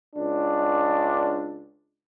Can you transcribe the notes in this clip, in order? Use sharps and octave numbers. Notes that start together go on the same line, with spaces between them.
C#2 D4